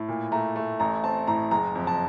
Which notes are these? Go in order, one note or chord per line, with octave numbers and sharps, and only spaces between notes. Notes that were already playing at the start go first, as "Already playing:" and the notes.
Already playing: A2
A#2
A3 A#5
A3
A1 A#5
C4 A5
A2 A#5
F#1 A#5
F2
A5